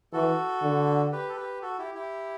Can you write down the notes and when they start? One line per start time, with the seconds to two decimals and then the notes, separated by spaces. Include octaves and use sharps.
0.13 E3 F#4 A4
0.62 D3
1.12 G4 B4
1.29 A4
1.36 G4 B4
1.62 F#4 A4
1.79 E4 G4
1.94 E4 G4